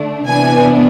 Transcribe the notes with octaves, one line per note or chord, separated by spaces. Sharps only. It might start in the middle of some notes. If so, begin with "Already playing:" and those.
Already playing: D3 A3 D4
C3 E3 B3 D4 G#5